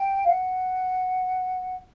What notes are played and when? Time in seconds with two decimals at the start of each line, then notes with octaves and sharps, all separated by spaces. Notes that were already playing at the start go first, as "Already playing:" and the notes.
Already playing: G5
0.23 F5
0.28 F#5